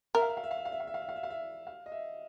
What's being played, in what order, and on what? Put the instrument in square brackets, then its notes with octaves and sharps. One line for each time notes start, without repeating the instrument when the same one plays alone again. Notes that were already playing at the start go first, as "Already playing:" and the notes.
[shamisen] A#4 [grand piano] E5
[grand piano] F5
E5
F5
E5
F5
E5
F5
E5
F5
E5
F5
E5
F5
E5
F5
E5
F5
D#5
E5